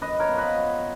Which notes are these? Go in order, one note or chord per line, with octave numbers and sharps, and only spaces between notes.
F#2 B4 D#5
A#4 C#5
F3 B3
B4 D#5
F#2